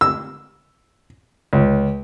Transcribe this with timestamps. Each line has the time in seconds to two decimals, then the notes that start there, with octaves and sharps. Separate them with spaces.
0.01 E6
1.53 C#2